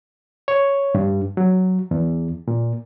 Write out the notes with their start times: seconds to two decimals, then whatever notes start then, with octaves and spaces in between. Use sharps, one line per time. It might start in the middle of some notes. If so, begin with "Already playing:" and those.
0.48 C#5
0.95 G2
1.37 F#3
1.91 E2
2.48 A#2